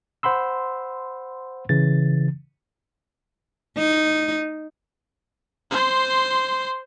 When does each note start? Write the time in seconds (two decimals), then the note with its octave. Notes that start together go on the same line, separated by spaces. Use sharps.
0.23 C5 F#5 B5 C6 E6
1.69 C#3 E3 A6
3.78 D#4
5.71 C5 C6